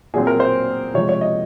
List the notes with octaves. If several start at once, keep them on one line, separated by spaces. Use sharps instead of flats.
A#2 F#3 C4 G#4
A#4
C5
C3 F3 G#3 C#5
C#5
D#5